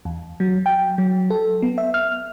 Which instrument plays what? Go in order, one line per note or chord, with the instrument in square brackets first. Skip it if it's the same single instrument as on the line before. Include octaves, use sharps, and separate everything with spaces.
[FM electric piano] E2
F#3
G5
F#3
A4
B3
E5
F6